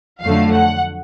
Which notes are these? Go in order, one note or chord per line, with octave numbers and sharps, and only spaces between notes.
F2 D3 F#3 A3 F5
F#5